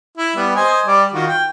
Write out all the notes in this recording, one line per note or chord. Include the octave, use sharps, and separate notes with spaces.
E4
G3 B3
C5 D#5 G#5
G3 D5
D#3 F4 F#4
G5